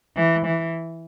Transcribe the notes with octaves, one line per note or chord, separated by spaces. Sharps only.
E3
E3